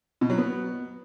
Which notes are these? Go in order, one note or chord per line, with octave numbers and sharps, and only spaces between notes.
B2
F#3
B3